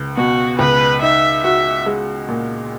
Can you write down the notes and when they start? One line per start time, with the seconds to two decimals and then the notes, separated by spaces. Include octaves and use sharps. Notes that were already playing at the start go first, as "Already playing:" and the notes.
Already playing: C#2
0.16 B2 F#4
0.59 C#2 B4
1.02 D#4 E5
1.43 F#4 E5
1.86 G#3
2.28 A#2